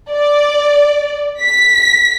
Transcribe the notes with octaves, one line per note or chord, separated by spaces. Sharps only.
D5
B6